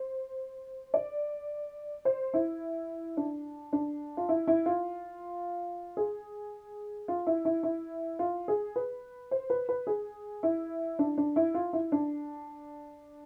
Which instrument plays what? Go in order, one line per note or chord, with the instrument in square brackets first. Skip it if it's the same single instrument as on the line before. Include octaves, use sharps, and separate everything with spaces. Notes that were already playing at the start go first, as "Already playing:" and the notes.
Already playing: [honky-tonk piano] C5
D5
C5
E4
D4
D4
F4
E4
E4
F4
G#4
F4
E4
E4
E4
F4
G#4
B4
C5
B4
B4
G#4
E4
D4
D4
E4
F4
E4
D4